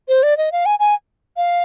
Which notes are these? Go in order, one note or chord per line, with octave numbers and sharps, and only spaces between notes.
C5
D5
D#5
F5
G#5
G#5
F5